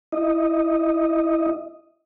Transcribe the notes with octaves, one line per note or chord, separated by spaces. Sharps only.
E4 D#5